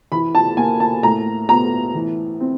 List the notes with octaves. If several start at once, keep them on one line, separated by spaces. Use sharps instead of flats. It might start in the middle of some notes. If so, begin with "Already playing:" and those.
E3 B5
A5
A#3 G#5
A5
A2 A#5
B3 A#5
E3
C4